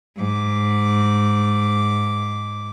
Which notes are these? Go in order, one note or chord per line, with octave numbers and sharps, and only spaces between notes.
G#2 D6